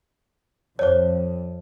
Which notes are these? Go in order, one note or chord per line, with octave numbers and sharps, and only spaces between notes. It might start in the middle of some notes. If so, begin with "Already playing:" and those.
F2 C5 C#5